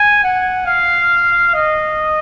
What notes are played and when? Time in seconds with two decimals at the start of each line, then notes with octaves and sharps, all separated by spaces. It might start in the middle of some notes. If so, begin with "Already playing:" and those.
Already playing: G#5
0.24 F#5
0.66 F5
1.54 D#5